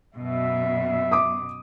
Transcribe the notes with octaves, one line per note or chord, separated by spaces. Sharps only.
F#2 B2 E5
D6 D#6